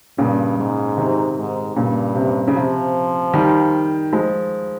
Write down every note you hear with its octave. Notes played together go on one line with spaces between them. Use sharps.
G2 A#2 C#3
G#2
C3 D#3
G#2
G2 A#2 C#3
C3
C#3
C3 F3
D#3 G3
F3 G#3